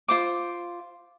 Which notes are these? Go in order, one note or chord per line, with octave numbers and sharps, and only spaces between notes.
F4 C5 D6